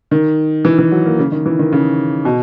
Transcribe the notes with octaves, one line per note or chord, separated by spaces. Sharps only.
D#3
E3
E3
F#3
A#3
C#3
D#3
E3
D#3
C#3
B2